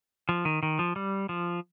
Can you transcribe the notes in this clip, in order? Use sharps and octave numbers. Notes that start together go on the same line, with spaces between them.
F3
D#3
D#3
F3
G3
F3